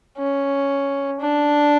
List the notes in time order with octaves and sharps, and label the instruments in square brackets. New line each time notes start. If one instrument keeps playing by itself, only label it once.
[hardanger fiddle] C#4
D4